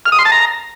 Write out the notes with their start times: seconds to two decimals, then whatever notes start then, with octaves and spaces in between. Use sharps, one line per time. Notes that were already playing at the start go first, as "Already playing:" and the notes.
0.06 F6
0.12 D#6
0.19 C6
0.25 A5
0.32 A#5